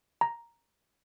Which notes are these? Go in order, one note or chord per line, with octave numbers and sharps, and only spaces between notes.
A#5